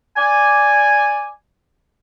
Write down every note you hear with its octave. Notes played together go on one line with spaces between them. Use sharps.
D5 G#5